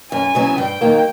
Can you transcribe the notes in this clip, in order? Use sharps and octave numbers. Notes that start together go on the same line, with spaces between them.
F#2 G#5
C#3 F#3 B3 E4
G2 G5
D#3 F#3 A#3